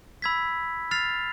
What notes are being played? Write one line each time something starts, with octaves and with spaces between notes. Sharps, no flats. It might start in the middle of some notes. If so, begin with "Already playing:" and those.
B5 E6 G#6 B6
F6 A6 C7 F7